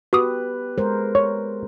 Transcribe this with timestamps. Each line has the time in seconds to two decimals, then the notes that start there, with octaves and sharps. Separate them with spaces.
0.13 B3 F#4 G4 B4 D6 D#6
0.78 G#3 A#4 C5
1.15 C#5